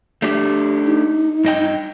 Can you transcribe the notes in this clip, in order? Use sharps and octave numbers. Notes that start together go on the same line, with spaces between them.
A3 D4 G4
D#4
G2 D#5 G5